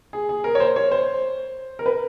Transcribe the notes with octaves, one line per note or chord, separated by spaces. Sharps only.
G#4
G#4
A#4
C#5
C5
C#5
C5
A#4
B4